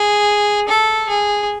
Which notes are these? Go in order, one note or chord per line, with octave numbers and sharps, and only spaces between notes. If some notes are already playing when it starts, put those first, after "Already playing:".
Already playing: G#4
A4
G#4